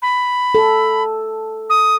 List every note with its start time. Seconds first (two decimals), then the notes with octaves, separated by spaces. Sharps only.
0.02 B5
0.55 A4
1.70 D#6